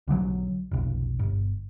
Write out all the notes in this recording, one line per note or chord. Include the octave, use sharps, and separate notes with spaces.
B1 D3 D#3 F#3
F1 B1
G1